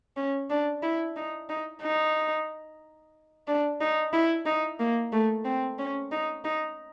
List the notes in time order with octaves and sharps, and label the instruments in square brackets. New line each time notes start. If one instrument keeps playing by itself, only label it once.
[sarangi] C#4
D4
E4
D#4
D#4
D#4
D4
D#4
E4
D#4
A#3
A3
C4
C#4
D#4
D#4